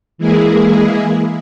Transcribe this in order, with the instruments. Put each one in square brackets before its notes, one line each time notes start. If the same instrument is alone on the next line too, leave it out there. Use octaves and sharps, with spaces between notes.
[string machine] E3 G#3 A#3 E4 G#4